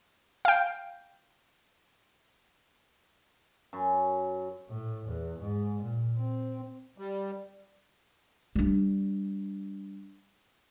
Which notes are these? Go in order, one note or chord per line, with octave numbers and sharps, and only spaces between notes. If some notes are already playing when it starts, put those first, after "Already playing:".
F5 G5
F#2
A2
E2
G#2
A#2
C4
G3
G3 D4